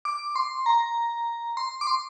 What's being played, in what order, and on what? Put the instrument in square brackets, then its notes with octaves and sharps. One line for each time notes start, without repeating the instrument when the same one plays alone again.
[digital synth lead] D6
C6
A#5
C6
D6
C6